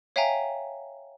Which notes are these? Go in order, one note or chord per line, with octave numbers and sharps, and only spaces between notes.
C#5 E5 F5 G5 G#5 A#5